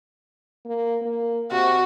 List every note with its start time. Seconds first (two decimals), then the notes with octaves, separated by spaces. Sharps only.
0.65 A#3
1.02 A#3
1.52 C3 F#4